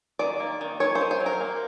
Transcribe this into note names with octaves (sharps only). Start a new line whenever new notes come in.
D#3 D5
A#3
D#3
D#3 C#5
C5
D#3
C5
F#3
A#4
A#3